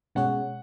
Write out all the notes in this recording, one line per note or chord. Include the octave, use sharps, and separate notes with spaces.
B2 G#3 C#4 G#4 C#5 F#5